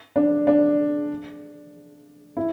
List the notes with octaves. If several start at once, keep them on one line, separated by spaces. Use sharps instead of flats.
D4
D4
E4